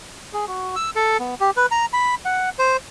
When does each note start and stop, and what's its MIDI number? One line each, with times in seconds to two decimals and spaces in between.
0.33 0.45 68
0.47 0.75 66
0.76 0.90 88
0.95 1.18 69
1.20 1.35 59
1.40 1.51 67
1.57 1.66 71
1.71 1.86 82
1.93 2.15 83
2.25 2.50 78
2.59 2.77 72